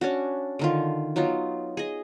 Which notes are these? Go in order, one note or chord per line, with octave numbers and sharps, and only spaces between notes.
C#4 D4 F#4
D3 D#3 F4
F#3 B3 D#4 F4
G#4 D#5